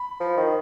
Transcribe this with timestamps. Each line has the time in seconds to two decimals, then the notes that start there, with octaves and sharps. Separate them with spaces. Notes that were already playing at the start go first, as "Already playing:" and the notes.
Already playing: B5
0.20 F3
0.37 D#3